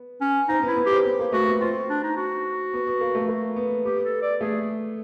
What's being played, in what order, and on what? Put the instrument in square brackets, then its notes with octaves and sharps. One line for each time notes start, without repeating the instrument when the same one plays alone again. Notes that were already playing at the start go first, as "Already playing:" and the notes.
Already playing: [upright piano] B3
[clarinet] C#4
[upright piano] C4 [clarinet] D#4
[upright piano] B3
[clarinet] E4
[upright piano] B3
[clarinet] G4
[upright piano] C4
B3
A#3
[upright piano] A3 [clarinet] F#4
[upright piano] B3
[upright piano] C4 [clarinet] F4
[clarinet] D4
D#4
F#4
[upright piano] B3
B3
A#3
A3
A#3
B3
[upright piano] B3 [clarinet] G4
[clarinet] A4
D5
[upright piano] A3 [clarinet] G#4